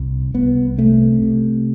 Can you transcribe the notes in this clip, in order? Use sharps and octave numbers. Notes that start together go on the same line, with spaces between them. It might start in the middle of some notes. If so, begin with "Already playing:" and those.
Already playing: C2
C2 B3
C3 A3
C3